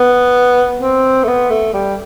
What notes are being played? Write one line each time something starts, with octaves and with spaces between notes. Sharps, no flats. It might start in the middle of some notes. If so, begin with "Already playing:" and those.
Already playing: B3
C4
A3
B3
A3
G3